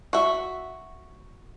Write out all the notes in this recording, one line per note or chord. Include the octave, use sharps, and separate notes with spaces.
F#4 E5